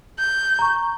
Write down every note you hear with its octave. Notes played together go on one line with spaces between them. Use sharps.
G6
A#5 C#6